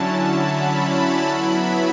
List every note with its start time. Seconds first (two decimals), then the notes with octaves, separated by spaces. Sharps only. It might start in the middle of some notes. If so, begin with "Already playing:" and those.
Already playing: D3 F#3 C#4 E4 A5
0.39 B5
1.31 F#3 B3 E4